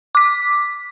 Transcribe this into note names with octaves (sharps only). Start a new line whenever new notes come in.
D6 B6